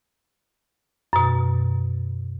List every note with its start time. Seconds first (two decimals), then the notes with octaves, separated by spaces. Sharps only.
1.13 F#2 B2